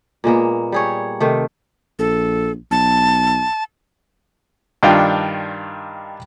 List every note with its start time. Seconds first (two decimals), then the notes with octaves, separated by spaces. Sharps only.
0.24 A#2 G#3 A#3 B3
0.72 G3 G#4 C#5
1.20 C3 D#3 A3
1.99 A#1 A4
2.71 B1 A5
4.83 G2 D#3 D4 F4 G5